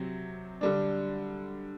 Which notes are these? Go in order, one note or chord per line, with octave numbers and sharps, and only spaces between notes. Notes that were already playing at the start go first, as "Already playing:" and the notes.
Already playing: C3 F#3 C4
D3 G3 D4